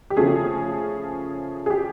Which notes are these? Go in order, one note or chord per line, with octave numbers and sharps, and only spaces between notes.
G4
C#3 F3 A3 C#4 G#4
G#4
G4